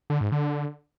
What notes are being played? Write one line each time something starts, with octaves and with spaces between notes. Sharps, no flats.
D3
G#2
D3